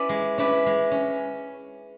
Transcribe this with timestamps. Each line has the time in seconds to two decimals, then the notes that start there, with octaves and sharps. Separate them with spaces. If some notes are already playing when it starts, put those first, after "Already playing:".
Already playing: C#4 E4 B4 D5
0.09 G#3
0.38 C#4 E4 B4 D5
0.66 G#3
0.92 C#4